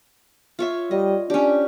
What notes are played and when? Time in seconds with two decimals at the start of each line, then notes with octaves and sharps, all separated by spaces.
0.59 F4 C#5 E5
0.91 G3 D#5
1.30 C#4 D4 G4